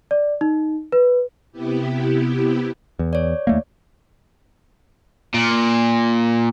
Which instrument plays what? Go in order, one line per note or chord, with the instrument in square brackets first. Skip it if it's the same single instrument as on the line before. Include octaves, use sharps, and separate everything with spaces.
[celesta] D5
D#4
B4
[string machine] C3 B3 E4 G4
[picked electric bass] E2
[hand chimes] C#5 D5
[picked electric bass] D#2 A3 A#3
[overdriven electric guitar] A#2